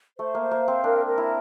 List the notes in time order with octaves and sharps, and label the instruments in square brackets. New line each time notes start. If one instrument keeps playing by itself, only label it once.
[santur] A3 [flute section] C5
[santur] A#3
[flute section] C5
[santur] A#3
[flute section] F5
[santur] C4
[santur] D4 [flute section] A#4
[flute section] A#4
[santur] E4